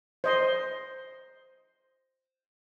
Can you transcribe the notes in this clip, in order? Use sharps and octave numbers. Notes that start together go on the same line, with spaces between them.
C5 D#5 C6